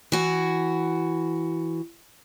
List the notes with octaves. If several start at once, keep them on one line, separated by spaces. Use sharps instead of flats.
E3 F#4